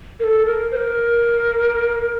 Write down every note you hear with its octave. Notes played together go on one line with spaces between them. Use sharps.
A#4
A4
A#4
C5
A#4